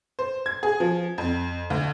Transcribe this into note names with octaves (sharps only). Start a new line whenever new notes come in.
C5
G#6
G#4
F3
F2
D2